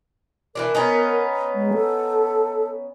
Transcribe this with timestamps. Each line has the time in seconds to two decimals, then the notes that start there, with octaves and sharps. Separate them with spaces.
0.55 E3 F3 D4 A#4
0.75 B3 C#4 D#4
1.55 G#3
1.74 A4